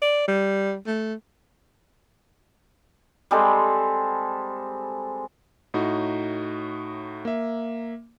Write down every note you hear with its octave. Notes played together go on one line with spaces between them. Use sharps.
D5
G3
A3
G3 G#3 C4 A4
A2 D#4 F#4
A#3 E5